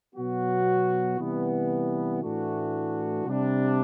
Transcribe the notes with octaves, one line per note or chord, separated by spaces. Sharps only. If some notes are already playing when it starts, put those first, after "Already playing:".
B2 F#3 B3 F#4
C3 E3 G3 B3
A2 E3 A3 D4 F#4
C3 G3 D4